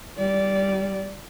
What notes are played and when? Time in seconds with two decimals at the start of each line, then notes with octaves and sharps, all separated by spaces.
0.18 G3 D5